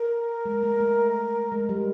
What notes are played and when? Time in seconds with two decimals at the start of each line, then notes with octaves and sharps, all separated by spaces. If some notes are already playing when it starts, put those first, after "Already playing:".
Already playing: A#4
0.45 G#3
0.63 A3
0.80 A3
1.52 G#3
1.69 G3